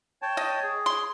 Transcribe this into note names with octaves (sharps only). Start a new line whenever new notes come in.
C#5 G5 A5
D#5
G#4
C6